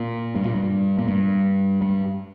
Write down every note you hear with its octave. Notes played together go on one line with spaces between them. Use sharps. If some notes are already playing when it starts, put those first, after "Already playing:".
Already playing: A#2
G2
A#2
G2
A#2
G2
G2